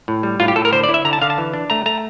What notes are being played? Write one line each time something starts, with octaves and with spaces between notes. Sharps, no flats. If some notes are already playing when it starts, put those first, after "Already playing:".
A2
G3
A2 F4
G4
A2 A4
A#4
D3 C5
D5
E4
E5
D3 A#5
A5
D3 F5
A5
E3
D4
A3 A#5
A3 A#5